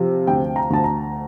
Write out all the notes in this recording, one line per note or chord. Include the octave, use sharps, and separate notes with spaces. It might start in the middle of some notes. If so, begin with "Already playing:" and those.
Already playing: C3 F3
D2 G5
A#5
D2 A5
A#5